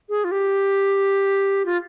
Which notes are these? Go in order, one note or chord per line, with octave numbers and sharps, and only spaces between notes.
G#4
F4
G4
F4